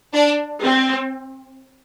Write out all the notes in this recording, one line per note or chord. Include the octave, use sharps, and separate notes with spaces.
D4
C4